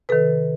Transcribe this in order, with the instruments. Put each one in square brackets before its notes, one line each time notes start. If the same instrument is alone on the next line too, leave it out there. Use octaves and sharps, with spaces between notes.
[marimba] C3 D#3 A4 B4